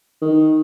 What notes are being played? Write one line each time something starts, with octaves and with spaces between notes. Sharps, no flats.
D#3